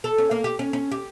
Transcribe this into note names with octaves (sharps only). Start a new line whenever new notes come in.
A4
C#4
A#3
G4
C#4
C#4
G4